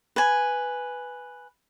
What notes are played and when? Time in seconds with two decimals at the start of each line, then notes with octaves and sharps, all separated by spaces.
0.16 B4 G#5